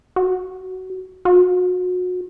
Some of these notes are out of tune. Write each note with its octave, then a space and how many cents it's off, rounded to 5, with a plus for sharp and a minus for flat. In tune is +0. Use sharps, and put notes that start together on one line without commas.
F#4 +15
F#4 -30